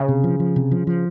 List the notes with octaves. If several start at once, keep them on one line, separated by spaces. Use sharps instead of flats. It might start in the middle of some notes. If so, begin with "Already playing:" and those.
Already playing: C#3
C3
F3
F3
C3
F3
F3